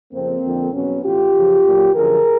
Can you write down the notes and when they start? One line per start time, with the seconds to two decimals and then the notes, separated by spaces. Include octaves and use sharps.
0.12 F2 C#3 F3 A#3 C4
0.43 F2 D3 F3
0.73 E2 B2 F#3 B3 C#4
1.04 A2 E3 F4 G4
1.34 F#2 C#3 F3
1.64 A#2 F#3
1.94 F#2 D3 F3 G#4 A#4